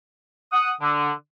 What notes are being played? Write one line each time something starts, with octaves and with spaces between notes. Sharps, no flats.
F#5 D#6
D3